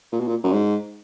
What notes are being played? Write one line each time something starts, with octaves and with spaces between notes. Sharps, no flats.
A#2
B2
A#2
F#2
G#2